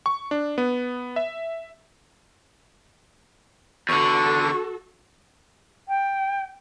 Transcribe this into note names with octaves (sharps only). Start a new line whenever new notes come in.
C#6
D4
B3
E5
E2 D3 F#4 A4 C#6
G5